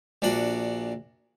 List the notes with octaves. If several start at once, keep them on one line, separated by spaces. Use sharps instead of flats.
A#1 A#2 D4 F#4 F#5